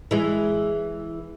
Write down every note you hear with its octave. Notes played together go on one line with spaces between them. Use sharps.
E3 G#3